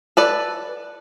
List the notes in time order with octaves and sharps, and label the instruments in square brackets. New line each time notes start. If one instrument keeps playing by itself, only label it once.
[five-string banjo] A4 B4 D5